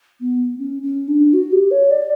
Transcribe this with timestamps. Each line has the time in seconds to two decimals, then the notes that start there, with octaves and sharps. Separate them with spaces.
0.20 B3
0.58 C#4
0.82 C#4
1.07 D4
1.33 F#4
1.52 G4
1.71 C#5
1.90 D5